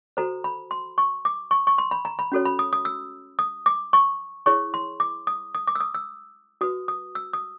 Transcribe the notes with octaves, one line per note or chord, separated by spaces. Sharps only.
F#4 A4 C5 A#5
B5
C6
C#6
D6
C#6
C#6
C6
B5
A#5
B5
C#4 F#4 A4 C#5
B5
D#6
D#6
E6
D#6
D6
C#6
E4 G#4 C#5 C#6
C6
D6
D#6
D#6
D6
E6
D#6
E6
F#4 B4 D#6
D#6
E6
D#6